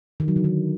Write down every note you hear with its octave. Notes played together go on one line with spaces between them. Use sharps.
D#3
F#3
D3
D#3